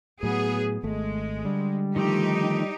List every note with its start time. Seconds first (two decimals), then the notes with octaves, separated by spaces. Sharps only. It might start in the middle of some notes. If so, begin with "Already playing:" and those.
0.23 A2 F#3 B3 G#4
0.83 G#1 G#3 A3
1.45 D3 G3
1.96 D#3 F3 A3 D#4 G4